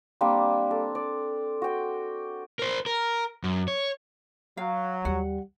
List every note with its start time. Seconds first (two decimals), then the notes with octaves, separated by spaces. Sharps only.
0.21 G3 A#3 C4 D4
0.71 A4
0.95 D5
1.62 F#4 G5
2.59 A#4 C5
2.86 A#4
3.44 F#2
3.68 C#5
4.57 F#3 F5
5.05 D#2 G3 F#5